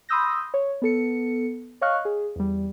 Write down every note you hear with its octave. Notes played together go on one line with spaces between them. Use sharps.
B5 C6 D#6 E6 G6 A#6
C#5
B3 A4 C#7
C#5 D#5 F5 C#6 F6 F#6
G#4
E2 G3